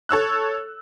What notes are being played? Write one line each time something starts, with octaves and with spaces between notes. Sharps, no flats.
A4 C#5 E6 F#6